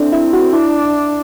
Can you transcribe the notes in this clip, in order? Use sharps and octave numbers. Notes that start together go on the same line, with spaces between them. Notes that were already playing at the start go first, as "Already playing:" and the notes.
Already playing: C4 D4 E4 A4
E4
F#4
D4 E4